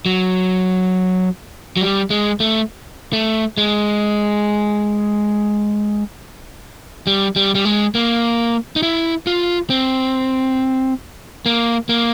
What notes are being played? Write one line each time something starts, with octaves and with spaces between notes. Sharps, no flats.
F#3
F#3
G3
G#3
A3
A3
G#3
G3
G3
G3
G#3
A#3
D#4
E4
F4
C4
A#3
A#3